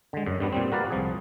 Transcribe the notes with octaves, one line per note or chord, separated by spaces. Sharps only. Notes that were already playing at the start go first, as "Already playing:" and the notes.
D3 G#3
F#2
G2 G3 B3 D4
A#2 G3 C4
F#4 A#4 B4 D5 F5
C2 F3 G#4